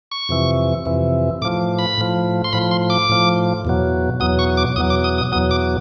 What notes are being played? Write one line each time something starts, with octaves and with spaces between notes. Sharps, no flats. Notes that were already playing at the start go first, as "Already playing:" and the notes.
C#6
F2 C3 E3
F2 C3 E3
A2 F3 D6
B5
A2 F3
C6
A2 F3 B5
C6
D6
A2 F3
E2 B2 F#3
E2 B2 F#3 D#6
C#6
D6
E2 B2 F#3 D#6
D6
D#6
D#6
E2 B2 F#3 D#6
D6